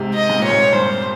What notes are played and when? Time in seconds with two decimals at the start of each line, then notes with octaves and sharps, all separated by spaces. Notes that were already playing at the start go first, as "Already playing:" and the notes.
Already playing: G#2 C3
0.15 D#5
0.30 G#2
0.39 A#2 C#5
0.50 G#2
0.73 G2 C5